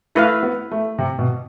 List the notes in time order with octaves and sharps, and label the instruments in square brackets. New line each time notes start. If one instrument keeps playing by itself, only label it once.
[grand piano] A3 [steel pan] E4 B4 F5
[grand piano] B3
A3
C3
B2